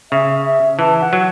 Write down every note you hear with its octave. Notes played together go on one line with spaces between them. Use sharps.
C#3 E5
E5
E3 A5
F#5
F#3